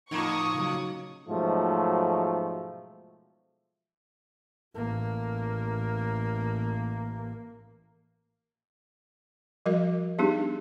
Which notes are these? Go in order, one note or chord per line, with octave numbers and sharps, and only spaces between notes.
F2 A2 A#3 D#4 C#6 D#6
C#3 F#3
G#2 B2 F3 F#3 A3
A1 A#3
F3 G3 F#4 A#4 D#5
G3 B3 D4 D#4 G4 G#4